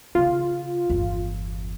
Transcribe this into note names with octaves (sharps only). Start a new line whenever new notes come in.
C#3 B3 F4
G1 E2